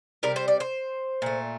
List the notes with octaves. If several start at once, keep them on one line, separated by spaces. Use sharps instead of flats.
C3 G3 A#4
C5
D5
C5
A#2 A3